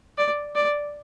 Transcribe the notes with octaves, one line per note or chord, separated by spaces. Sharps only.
D5
D5